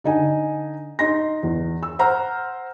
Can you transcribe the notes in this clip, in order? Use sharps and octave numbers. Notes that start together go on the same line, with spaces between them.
D3 D#4 G#5
D#4 C6 A#6
E2
E6
C5 F#5 A#5 F6